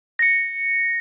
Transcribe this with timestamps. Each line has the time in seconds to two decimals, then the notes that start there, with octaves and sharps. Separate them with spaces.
0.19 A#6 C#7